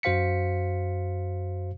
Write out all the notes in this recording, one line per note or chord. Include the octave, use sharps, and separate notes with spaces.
F#2 F#4 C5 F5 B6 C#7